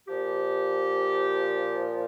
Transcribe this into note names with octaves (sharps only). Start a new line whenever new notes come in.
A#2 F3 G4